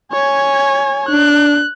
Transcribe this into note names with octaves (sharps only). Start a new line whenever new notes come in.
C#5 G#5
D4 F#6